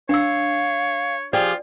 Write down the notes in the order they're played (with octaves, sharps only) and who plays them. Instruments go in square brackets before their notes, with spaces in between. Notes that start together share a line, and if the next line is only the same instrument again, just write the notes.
[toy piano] D4 E6 [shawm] C#5 [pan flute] F5
[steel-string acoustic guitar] F3 G4 G#4 [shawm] F4 [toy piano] D5